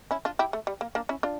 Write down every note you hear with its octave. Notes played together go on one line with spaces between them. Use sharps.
C#4 E4
D4 F4
E4 G4
A3
G3
A#3
A#3 D4
C#4 E4
D4 F4